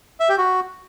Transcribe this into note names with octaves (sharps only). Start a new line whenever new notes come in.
E5
G4
F#4